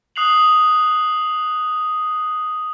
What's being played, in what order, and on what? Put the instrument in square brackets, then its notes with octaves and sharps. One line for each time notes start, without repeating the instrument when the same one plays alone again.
[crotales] D#6 F#6 C7 F7 F#7